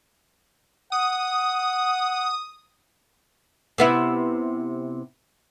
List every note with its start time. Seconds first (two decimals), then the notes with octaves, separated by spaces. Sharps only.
0.92 F#5 D#6
3.78 C3 B3 E4